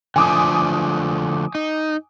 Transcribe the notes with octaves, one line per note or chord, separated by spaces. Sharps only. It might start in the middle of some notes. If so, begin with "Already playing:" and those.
D3 F3 A3 G#5 D6 D#6
D#4